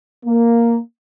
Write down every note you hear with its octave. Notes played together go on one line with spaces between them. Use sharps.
A#3